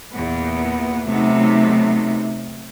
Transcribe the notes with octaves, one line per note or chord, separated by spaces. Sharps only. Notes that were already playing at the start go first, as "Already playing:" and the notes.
E2 A#2 B3
C3 F#3 A3 B3 D#4